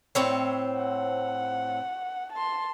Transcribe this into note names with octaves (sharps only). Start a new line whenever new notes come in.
A2 C4 C#5
F#5
A5 C6